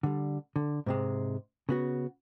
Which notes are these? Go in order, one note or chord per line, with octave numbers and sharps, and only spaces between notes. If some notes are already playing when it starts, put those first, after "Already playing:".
D3 G3
D3
G#2 C3 G#3
C#3 B3 F#4